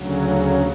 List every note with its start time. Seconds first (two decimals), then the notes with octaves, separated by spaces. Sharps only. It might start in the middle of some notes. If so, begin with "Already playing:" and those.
Already playing: D2 C#3 F#3
0.23 D4